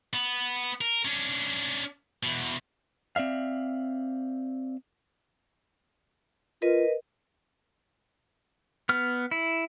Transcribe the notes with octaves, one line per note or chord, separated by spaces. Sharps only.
B3
A#4
C#4 D4
E2 B2
C4 D5 E5 F5
F4 A#4 B4 D#5
B3 F6
E4